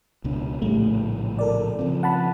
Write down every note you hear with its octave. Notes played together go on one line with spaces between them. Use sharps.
C#2 B2 D4
A#1 A2 C#3 G3 A3
A4 A#4 D5
C#3 F3 C4
F#5 A5 B5